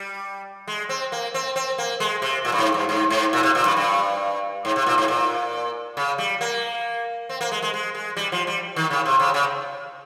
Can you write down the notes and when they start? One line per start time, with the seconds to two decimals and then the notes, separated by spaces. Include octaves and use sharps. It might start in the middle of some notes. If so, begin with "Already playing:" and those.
Already playing: G3
0.68 G#3
0.89 C4
1.12 A#3
1.34 C4
1.56 C4
1.78 A#3
2.00 G#3
2.22 C3
2.45 A#2
2.52 G2
2.58 G#2
2.74 G2
2.89 G#2
3.10 G#2
3.33 A#2
3.43 C3
3.55 A#2
3.65 G2
3.77 G2
4.65 G#2
4.76 C3
4.86 A#2
4.98 G#2
5.08 A#2
5.97 C#3
6.18 G3
6.41 A#3
7.29 C4
7.41 A#3
7.52 G#3
7.62 G#3
7.74 G#3
7.95 G#3
8.17 G3
8.32 F3
8.47 G3
8.76 D#3
8.91 C#3
9.06 C3
9.20 C#3
9.34 C#3